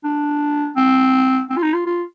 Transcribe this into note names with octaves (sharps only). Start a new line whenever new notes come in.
D4
C4
C4
F4
D#4
F4
F4